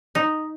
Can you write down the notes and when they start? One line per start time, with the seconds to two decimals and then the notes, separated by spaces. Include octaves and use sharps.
0.15 D#4